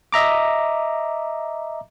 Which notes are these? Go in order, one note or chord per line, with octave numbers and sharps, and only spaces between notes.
D#5 E5 A#5 D6